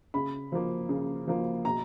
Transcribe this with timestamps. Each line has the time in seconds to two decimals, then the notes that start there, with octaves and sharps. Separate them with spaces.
0.14 C#3 B5
0.52 F3 A#3
0.89 C#3
1.27 F3 A#3
1.65 B2 A#5